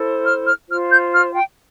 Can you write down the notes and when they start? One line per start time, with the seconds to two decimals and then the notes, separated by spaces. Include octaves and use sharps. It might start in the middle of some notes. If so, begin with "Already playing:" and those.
Already playing: E4 A4 C5
0.25 F6
0.46 F6
0.69 F4 C5 F6
0.90 G6
1.13 F6
1.34 G5